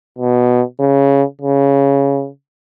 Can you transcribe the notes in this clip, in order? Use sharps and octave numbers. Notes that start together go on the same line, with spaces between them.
B2
C#3
C#3